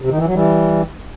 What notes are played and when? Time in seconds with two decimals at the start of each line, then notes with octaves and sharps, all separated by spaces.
0.02 C3
0.10 D#3
0.18 E3
0.26 F#3
0.34 E3 G3